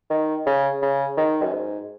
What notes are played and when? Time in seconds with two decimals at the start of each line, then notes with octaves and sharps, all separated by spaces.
0.10 D#3
0.46 C#3
0.82 C#3
1.17 D#3
1.43 F#2
1.53 G#2